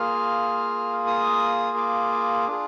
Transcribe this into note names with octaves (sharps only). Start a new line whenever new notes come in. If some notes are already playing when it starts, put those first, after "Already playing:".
Already playing: A#3 F4 G#4 F6
D#6
D6
D4 F4 G#4